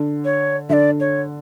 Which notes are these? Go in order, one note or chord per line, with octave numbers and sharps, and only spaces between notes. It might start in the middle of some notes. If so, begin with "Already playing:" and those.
Already playing: D3
C#5
D3 D5 E5
C#5